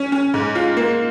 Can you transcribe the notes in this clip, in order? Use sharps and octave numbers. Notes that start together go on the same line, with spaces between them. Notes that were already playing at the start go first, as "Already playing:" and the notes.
Already playing: C#4
C#4
G#2
F4
A#3